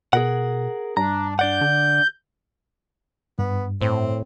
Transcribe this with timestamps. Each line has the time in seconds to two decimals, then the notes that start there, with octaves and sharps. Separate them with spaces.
0.13 B2 G#4 A#4 F#5
0.97 G2 D4 A#5
1.39 D4 D5 F#5 G6
1.61 D3
3.39 G2 B3
3.81 A2 C4